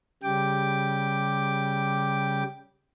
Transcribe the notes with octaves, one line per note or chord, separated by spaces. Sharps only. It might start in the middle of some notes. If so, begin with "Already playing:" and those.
C#3 G3 G4 G5 D6